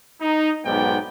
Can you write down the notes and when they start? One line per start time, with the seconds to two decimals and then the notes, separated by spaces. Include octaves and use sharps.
0.21 D#4
0.65 B1 G#2 B3 D5 G5